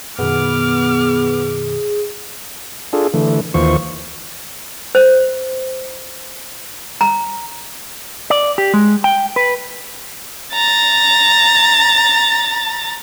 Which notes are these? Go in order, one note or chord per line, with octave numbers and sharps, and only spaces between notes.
F#2 B2 D#3 B3 G#4 D6 F6
D4 F4 G#4 A4
D3 E3 A3
D#2 E3 F4 C5 C#6
C5
A#5
D5
G4
G#3
G5
B4
A#5 A6